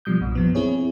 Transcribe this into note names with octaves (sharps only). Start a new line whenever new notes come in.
B2 F3 G3 D#6 G6
B1 G2 A#2
F#2 F3 B3
C4 E4 G#4 C#5